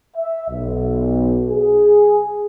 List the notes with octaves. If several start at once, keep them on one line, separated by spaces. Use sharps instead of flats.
E5
B1
G#4